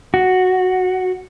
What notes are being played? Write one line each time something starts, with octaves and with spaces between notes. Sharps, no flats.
F#4